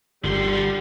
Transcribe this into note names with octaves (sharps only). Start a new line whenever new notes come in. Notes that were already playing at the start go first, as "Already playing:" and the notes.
G1 D3 G3 C6